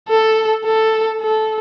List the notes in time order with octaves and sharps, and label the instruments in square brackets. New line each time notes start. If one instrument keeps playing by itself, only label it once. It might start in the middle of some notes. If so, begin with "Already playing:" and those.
[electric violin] A4
A4
A4